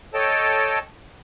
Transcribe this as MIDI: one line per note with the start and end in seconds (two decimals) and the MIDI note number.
0.14 0.79 69
0.14 0.79 73
0.14 0.79 75
0.14 0.79 79
0.14 0.79 81